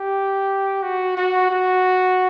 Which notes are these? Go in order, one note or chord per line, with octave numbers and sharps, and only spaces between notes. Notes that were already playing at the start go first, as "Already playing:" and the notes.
Already playing: G4
F#4
F#4
F#4